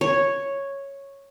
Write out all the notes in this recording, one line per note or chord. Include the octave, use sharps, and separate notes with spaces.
C#5